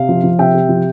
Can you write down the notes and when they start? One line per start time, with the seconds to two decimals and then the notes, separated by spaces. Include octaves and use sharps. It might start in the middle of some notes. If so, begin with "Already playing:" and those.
Already playing: C3 F5
0.09 F3
0.24 F3
0.39 C3 E5 G5
0.54 C3
0.69 F3